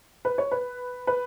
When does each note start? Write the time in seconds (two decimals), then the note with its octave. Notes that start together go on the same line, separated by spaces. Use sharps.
0.25 B4
0.38 C#5
0.51 B4
1.07 B4